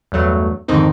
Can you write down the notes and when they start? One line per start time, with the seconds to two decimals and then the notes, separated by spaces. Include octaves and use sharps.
0.12 E2 G2 F#3 A3
0.68 F2 G#2 D3 D#3 C4 D#4